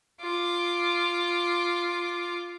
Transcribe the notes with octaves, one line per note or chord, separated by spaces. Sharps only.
F4 D6